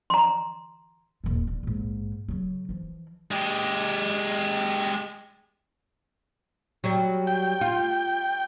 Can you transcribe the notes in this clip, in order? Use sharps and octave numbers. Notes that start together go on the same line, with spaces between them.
A#5 C6
D#1 G2
D3
A#1 G#2
C#3 F#3
E3 F3
G#3 G4
F#3 G3
G5
F4